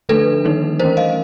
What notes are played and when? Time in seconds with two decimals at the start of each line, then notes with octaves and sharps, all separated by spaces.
0.09 D3 F3 A3 D4 A4 B4
0.45 D#3 G3 A#3 D#4
0.79 E3 A3 C#4 A#4 C5
0.97 D#5 F5